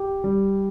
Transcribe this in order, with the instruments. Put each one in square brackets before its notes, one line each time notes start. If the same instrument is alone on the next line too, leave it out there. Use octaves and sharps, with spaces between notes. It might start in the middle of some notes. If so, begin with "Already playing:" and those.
Already playing: [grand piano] G4
G3